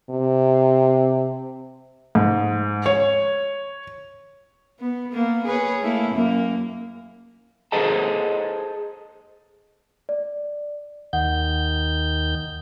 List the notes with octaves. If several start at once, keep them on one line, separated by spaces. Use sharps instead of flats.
C3
G#2
C#5
B3
A#3 B3
G#4 B4 C#5
A3 A#3 E4
F#2 A#3
G#4 A4 C5 D#5 A5 A#5
D5
D#2 D#3 F#5 G6